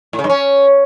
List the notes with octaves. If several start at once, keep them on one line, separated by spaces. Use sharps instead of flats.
A2
C#3
G2
C#4